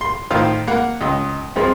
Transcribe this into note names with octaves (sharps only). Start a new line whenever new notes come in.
C6
A2 D#3 F4 C5
A#3 F#5
C#2 D#5
C2 F3 G#3